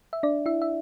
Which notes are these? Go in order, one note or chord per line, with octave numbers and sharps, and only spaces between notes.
E5
D4 D5
E4 E5
E5